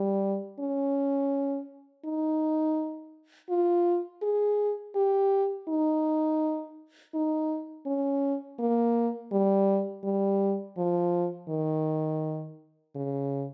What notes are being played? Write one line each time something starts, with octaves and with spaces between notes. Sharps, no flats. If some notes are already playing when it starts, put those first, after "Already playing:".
Already playing: G3
C#4
D#4
F4
G#4
G4
D#4
D#4
C#4
A#3
G3
G3
F3
D#3
C#3